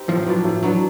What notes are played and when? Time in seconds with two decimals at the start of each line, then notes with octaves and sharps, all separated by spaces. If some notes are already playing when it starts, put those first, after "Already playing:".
Already playing: C4 D#4 G4
0.09 A2 F3
0.26 F#3 B3 D4
0.44 A2
0.63 F#3 B3 D4